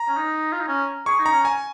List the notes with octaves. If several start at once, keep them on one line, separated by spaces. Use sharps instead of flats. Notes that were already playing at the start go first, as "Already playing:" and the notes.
Already playing: A#5
C#4
D#4
F4
D#4
C#4
G#4 C#6
D#4
A#5
C#4
G#5